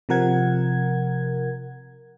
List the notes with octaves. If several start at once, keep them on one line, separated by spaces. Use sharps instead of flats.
C3 F3 A#4 F#5 G#6